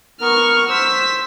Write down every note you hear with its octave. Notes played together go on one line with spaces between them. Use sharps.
B3 A#4 C#6 F6
C5 E6 B6